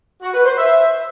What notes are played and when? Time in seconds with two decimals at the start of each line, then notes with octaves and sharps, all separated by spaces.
0.22 F#4
0.33 B4
0.45 C5
0.57 E5